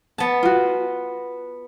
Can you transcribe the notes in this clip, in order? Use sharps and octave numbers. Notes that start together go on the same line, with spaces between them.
B3 A5
F4 F#4